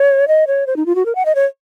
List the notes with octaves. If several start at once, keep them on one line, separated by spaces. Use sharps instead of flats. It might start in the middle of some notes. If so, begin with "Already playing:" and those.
Already playing: C#5
D#5
C#5
C5
D#4
F4
F#4
A#4
F#5
D#5
C#5